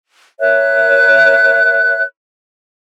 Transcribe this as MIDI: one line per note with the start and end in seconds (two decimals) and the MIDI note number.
0.40 2.03 70
0.40 2.03 73
0.40 2.03 76
0.40 2.03 90